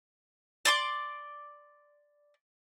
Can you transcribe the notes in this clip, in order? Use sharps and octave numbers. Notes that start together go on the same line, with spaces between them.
D5 C6 D6